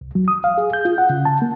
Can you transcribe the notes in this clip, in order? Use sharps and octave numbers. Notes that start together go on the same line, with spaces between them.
C2
F#3
D#6
F5
G#4
G6
F4
F#5
C#3
A5
A#3